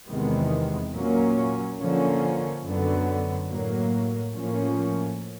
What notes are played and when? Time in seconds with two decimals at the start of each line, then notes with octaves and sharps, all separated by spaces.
0.08 E2 C3 D#3 G#3 B3
0.93 A#2 F#3 A#3 C#4
1.78 D3 F3 A#3 C#4
2.64 F#2 D3 F#3 B3
3.49 A2 F#3 A#3
4.34 A2 F3 A#3 C#4